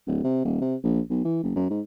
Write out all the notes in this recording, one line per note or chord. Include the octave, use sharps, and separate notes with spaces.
D1
C3
D#1
C3
A#1
B1
E3
F#1
F#2
G#2